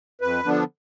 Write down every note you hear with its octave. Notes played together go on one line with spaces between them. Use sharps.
F2 B4
D3 F3 B3 D4